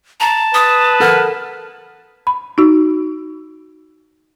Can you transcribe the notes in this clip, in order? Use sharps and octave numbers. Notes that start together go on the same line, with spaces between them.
A5 A#5
B4 D#6
A4 A#4 F#5 F6
B5
D#4 F#4